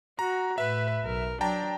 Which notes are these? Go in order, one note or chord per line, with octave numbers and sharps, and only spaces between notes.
F#4 A#5
A2 B4 E5
B1 A#4
F#3 D4 G5 A5 A#5